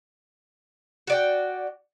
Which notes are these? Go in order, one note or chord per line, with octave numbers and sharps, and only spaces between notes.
F#4 D5 G5